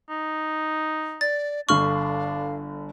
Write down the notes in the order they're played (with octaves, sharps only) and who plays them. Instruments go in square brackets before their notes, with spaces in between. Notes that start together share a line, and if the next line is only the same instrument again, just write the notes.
[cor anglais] D#4
[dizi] D5 [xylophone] A6
[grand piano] G1 D3 F#7 [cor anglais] D4 [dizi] F5 [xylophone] C#6 F6